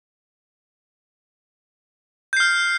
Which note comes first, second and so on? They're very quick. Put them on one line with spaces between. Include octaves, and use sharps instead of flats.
G6 C7 F6